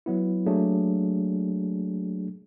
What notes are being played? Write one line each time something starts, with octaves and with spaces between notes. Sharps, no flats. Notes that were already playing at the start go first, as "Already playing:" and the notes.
F#3 B3 E4
F#3 A3 A#3 D4 G#4